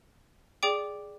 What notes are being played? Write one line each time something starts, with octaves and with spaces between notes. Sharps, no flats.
G#4 D5 G5 D6